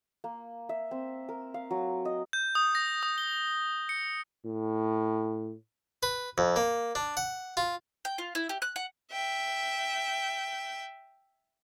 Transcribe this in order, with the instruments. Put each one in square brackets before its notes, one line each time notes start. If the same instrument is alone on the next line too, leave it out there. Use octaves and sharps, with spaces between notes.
[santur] A#3
E5
C4
A#4
F5
F#3
D#5
[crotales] G6
D#6
A#6
D#6
G7
C#7
[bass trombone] A2
[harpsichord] B4
F2
A#3
D4
F#5
F4
[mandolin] G5
F4
E4
G4
F#6
F#5
[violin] E5 G5